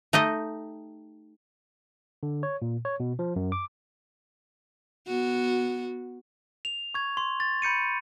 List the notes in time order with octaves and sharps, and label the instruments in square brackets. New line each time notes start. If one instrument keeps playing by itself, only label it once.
[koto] A3 D#4 G4 D#5
[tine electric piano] D3
C#5
A#2
C#5
B2
F3
F#2
D6
[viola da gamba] B3 F#4
[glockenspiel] F7
C#6 G#6
C6
A6
B5 G6 C#7 D#7